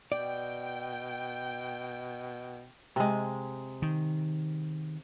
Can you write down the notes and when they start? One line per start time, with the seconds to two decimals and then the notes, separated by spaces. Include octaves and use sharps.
0.12 B2 D5 G5
2.96 C3 G#3
3.82 D#3